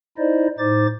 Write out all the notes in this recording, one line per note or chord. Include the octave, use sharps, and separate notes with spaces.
D#4 E4 C5 D5 D#5
A2 D#4 C5 D6 A6